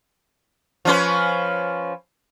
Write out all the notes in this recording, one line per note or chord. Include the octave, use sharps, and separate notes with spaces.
F3 C#4 B4